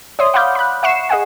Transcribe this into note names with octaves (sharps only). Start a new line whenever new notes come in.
C#5 D5 E5 C6 D#6
F5 F#5 B5 D6 F6 G6
B5 F#6
E5 F#5 C#6 C7 C#7 E7
G#4 D#5 F#5 G#5